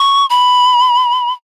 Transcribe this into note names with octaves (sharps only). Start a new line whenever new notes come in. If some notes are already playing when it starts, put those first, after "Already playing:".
Already playing: C#6
B5